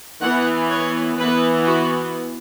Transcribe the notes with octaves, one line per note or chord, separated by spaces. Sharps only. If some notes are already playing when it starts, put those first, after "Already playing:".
E3 B3 F#5
C#5
E3 B3 B4
F#4